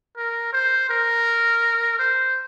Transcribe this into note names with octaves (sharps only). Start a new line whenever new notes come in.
A#4
C5
A#4
C5